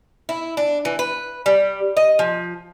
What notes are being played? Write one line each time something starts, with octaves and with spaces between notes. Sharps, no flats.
E4
D4
E3
B4
G3
D#5
F3